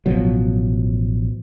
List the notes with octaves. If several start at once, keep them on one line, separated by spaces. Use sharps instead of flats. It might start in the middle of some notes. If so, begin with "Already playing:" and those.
A1 B2 F3 F#3